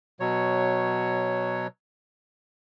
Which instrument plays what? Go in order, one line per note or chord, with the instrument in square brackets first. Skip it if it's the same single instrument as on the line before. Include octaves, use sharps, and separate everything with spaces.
[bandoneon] B2 F#3 C#5